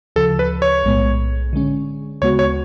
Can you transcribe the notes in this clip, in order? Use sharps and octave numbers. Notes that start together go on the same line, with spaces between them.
D2 C#3 F3 A4
B4
C#5
B1 A2 G#3 B3
D3 G#3 C#4
D2 C#3 G#3 B3 F#4 C#5
C#5